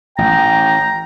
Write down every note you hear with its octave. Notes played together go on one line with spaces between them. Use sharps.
A1 G5 A#5